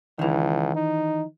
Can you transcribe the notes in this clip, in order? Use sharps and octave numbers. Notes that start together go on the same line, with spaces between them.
C#2 D#3 E3
D#4